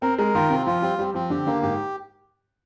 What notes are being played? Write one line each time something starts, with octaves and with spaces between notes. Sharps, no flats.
C4 A#4
G#3 A#4
D#3 F4
C3 C4
F3 F4
G3 C4
G3 C4
F3 C4
D3 G4
D3 A#3
G#2 G4